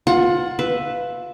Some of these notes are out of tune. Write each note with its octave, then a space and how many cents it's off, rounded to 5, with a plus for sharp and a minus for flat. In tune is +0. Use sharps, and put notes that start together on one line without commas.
F4 +20 F#5 +0
B4 +5 E5 -5